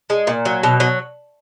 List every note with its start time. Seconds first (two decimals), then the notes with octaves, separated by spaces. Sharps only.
0.10 G#3
0.27 A#2
0.45 F#3
0.63 B2
0.80 F#3